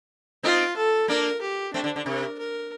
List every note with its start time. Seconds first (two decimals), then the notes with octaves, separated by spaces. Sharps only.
0.43 C4 D#4 F4
0.76 A4
1.08 A#3 D4 A#4
1.41 G4
1.74 A3 C4 D4
1.84 D3
1.96 D3
2.06 C3 A#4
2.38 A#4